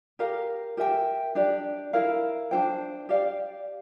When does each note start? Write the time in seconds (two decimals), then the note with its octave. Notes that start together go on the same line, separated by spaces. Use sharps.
0.19 G4 A#4 F5
0.77 G4 A#4 E5 G5
1.35 D4 G4 D5
1.93 E4 A#4 F5
2.51 D4 F4 C5 G5
3.09 G4 D5 F5